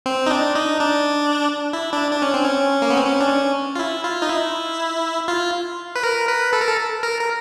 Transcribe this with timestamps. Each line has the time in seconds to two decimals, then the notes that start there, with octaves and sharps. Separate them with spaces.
0.06 C4
0.26 D#4
0.30 D4
0.55 D#4
0.80 D4
1.73 E4
1.93 D4
2.11 D4
2.22 C#4
2.34 C4
2.45 C#4
2.82 A#3
2.90 B3
2.97 C4
3.05 C#4
3.21 D4
3.29 C#4
3.75 F4
3.79 E4
4.04 F4
4.22 D#4
4.29 E4
5.28 F4
5.96 B4
6.03 A#4
6.28 B4
6.53 A4
6.61 A#4
6.68 A4
7.03 A#4
7.21 A#4